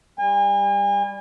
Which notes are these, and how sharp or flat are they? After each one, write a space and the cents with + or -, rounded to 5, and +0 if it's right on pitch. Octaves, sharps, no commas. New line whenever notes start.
G3 +10 G#5 -40